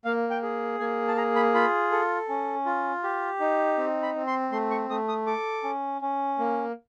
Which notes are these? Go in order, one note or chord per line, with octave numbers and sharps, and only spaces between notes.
A#3 F5
G5
G#4
A#3 G#5
A5
G#4 A#5
B5
F4 B5
A4
C#4
F4
G4
D#4
C4
B5
C4
C6
A3 C6
C#6
A3 D#6
D#6
A4 D6
C#4
C#4
A#3